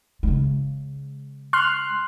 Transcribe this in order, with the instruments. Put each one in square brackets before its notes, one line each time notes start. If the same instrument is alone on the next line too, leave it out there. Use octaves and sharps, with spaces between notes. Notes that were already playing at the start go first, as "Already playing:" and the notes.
[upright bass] C#3 G#3
[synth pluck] C6 F6 F#6